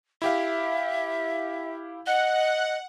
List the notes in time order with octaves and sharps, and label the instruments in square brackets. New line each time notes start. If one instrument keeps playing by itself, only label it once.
[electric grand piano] E4 G4 F5 [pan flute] E5
[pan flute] D#5 [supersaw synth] F#5